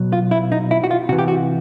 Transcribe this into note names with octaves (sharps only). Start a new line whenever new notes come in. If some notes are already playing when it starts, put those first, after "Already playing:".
Already playing: B2 F#3
F4
E4
D#4
E4
F#4
F4
C3 E3 F#4
G4
F#4